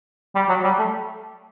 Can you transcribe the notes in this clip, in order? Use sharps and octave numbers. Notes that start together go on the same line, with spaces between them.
G3
F#3
G3
A3